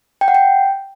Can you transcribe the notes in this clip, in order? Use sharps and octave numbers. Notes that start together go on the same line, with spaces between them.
G5
F#5
G5